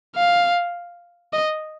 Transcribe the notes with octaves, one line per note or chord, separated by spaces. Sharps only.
F5
D#5